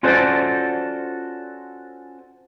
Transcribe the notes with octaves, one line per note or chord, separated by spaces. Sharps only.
C#4 F4 F#4 A4 C5 D5